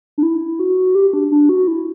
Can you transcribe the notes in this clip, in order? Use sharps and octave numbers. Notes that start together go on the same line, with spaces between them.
D4
E4
F#4
G4
D4
D4
F#4
E4